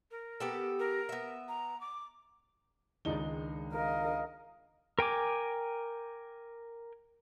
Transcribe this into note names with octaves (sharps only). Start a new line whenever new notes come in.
A#4
B3 G4 A4
A#4
B3 E5
A#5
D6
C#2 D#3 G#3 D4 D#4 G7
A#4 D#5 F5
A#4 G5 G#5 D6